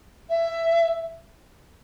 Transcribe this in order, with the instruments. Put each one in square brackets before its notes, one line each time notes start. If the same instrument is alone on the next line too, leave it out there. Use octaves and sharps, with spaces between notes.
[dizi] E5